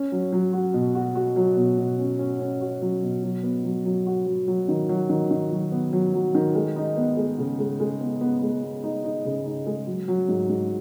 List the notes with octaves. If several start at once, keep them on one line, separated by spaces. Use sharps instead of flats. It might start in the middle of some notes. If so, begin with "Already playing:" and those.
Already playing: C#4
F#3
F#3
F#4
B2
F#4
F#4
F#3
B2
B2
C#4
C#4
C#4
F#4
F#3
B2
F#3
B3
F#3
F#3
F#4
F#3
F#3
D#3
F#3
D#3
D#3
F#3
B3
F#3
F#3
D#3
G#3
D#4
B3
G#3
C#3
G#3
G#3
B3
B3
G#3
B3
D#4
D#4
C#3
D#4
G#3
F#3
F#3
G#2
G#2